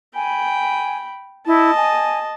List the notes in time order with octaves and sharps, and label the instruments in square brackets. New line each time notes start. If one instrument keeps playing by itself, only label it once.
[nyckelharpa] G5 B5 [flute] G#5
[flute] E4 [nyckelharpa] D#5 A5
[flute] G#5